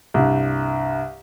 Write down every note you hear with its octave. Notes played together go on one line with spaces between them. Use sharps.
C2 G2